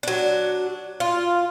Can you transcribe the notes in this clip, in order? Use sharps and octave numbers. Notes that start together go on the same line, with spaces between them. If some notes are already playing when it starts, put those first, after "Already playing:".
F#3 D4
F4